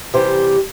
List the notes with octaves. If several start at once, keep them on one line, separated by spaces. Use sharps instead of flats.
C3 E3 G3 G4 C5